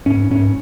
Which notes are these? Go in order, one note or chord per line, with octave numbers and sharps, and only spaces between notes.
G#2 C#4
G#2 C#4